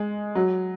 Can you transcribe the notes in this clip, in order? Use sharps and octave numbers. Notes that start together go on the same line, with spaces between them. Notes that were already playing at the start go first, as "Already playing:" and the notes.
Already playing: G#3
F#3